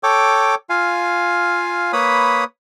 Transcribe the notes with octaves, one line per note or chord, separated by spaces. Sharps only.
A4 C#5 G5 D6
F4 F5 G#5
A#3 B4 C#5 B5 D#6